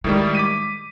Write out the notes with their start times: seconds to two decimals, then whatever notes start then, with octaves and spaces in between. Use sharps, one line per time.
0.04 A2 D#3 G3 G#3
0.35 D6 B6 D#7